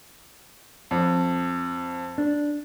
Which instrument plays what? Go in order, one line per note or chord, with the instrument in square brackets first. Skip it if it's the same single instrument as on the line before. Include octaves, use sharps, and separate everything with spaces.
[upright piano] F2
[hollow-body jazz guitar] D4